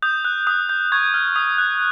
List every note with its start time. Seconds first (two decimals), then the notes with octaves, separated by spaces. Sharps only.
0.02 D#6 G6
0.25 F#6
0.47 D#6
0.69 G6
0.92 C#6 G#6
1.14 F6
1.36 D#6
1.58 F#6